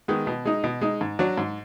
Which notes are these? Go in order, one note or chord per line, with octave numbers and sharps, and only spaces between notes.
D#3 G#3 B3
B2
G#3 D#4
B2
G#3 D#4
G#2
F#3 D4 F#4
G#2